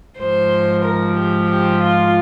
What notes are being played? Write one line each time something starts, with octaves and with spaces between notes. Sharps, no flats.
G#2 F3 C5
A#4
G4
G4
F4